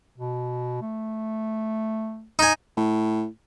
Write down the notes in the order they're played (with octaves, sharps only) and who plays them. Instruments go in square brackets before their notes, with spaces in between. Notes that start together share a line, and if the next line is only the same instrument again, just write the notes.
[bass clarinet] B2
A3
[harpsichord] D#4 G#5
[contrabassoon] A2